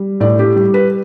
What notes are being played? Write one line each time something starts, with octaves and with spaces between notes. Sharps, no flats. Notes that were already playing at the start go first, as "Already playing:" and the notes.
Already playing: G3
A2 D5
G4
G3
B4